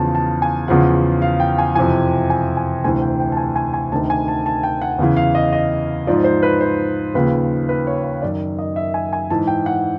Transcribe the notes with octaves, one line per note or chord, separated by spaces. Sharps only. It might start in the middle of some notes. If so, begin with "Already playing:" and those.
Already playing: E2 C#3 F3 A5
A5
G#5
E2 C#3 F3 F#5
F5
G5
G#5
F2 C3 E3 G#5
G#5
G#5
D2 C3 E3 G#5
G5
G5
A5
G#5
G#5
G#5
D2 C3 D#3 A5
G#5
A5
A5
G5
F#5
E2 C#3 E3 F5
F5
D#5
D#5
G#2 F3 D5
C5
B4
C5
D#2 C#3 F3 B4
B4
C#5
C#5
F#2 D#3 D5
D#5
E5
G#5
G#5
G#2 E3 A5
G5
F#5